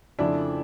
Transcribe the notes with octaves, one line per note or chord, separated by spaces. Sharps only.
F2 C#3 F3 A3 D4 E4